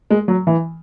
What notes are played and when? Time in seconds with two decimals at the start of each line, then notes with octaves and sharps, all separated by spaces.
0.11 G#3
0.28 F#3
0.47 E3